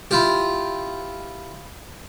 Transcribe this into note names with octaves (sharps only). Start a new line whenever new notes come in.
E4 F4 G4